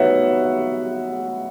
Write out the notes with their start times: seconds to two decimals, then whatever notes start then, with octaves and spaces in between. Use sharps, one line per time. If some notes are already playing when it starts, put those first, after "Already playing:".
Already playing: F#3 B3 D#4 F#4 E5 F#5